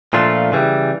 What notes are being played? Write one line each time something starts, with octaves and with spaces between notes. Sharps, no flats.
A#2 F3 A3 D4 F4
C#3 E3 G3